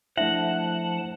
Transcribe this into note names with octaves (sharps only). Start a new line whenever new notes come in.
F3 A3 D4 E4 E5 F#5 A5